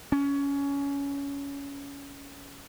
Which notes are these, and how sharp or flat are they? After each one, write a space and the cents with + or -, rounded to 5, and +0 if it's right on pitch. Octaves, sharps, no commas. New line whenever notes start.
C#4 +20